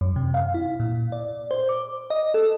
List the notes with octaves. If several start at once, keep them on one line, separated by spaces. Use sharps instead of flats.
F#2
C3
F5
E4
A#2
D5
C5
D6
D#5
A4